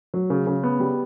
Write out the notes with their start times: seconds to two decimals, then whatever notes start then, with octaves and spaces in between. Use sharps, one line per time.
0.14 F#3
0.30 C#3
0.47 C#3
0.63 B3
0.80 G3